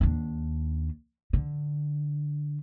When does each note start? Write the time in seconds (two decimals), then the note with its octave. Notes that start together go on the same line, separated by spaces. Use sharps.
0.01 D#2 D4
1.33 D3